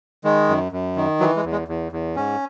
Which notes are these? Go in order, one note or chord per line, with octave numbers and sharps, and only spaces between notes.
D#3 G#3
F#2
F#2
D#3
E3 F#3
G#3
E2
G#3
E2
E2
G#2 C#4